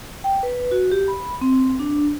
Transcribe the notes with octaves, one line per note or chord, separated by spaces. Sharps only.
G5
B4
F#4
G4
B5
C4
D4